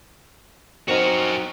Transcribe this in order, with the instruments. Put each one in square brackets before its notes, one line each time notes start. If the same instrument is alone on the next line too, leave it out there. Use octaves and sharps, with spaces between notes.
[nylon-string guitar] F#3 C4 D#4 [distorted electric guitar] F#4 A#4